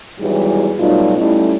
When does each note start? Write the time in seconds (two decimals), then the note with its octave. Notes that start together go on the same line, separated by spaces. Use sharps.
0.18 E2 G#2 D#3 E3 F#3 G3
0.78 B2 F#3 G3 A3 D#4 F4
1.17 G3 A3 C#4 E4